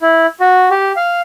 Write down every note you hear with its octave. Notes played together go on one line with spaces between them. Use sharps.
E4
F#4
G4
F5